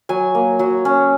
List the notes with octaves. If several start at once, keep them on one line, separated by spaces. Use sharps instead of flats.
F#3 G#5
A#3
F#3
C#4